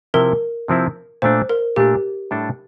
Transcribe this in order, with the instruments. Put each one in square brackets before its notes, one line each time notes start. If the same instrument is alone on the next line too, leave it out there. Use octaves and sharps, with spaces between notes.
[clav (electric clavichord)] C3 F3 C4 E4 [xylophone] A#4
[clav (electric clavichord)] C3 F3 C4 E4
[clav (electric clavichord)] A#2 A3 D4 [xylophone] C5
[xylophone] A#4
[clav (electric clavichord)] A#2 A3 D4 [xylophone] G4
[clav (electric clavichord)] A2 G3 D4 A4